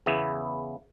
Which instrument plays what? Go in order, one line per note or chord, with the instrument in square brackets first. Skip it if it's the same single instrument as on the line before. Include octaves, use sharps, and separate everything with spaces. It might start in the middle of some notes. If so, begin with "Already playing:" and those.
[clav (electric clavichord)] E2 C#3 B3 E4